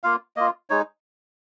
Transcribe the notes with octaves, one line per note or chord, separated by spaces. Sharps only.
A#3 F4 F5
A#3 F4 D#5
G#3 D#4 C#5